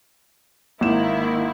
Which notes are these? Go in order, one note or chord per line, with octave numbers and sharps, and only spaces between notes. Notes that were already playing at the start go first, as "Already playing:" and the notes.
G#1 D#3 A#3 E4 E7